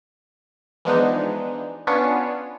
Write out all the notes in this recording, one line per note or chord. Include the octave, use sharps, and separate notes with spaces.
E3 F3 G#3 B3 D4 D#4
B3 C#4 D4 F4 C#5